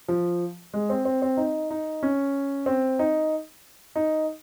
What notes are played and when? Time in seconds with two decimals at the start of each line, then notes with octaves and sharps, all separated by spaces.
0.08 F3
0.74 G#3
0.90 C4
1.05 C4
1.22 C4
1.37 D#4
1.70 D#4
2.03 C#4
2.66 C4
2.99 D#4
3.96 D#4